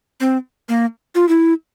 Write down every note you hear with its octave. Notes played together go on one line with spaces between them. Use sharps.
C4
A#3
F4
E4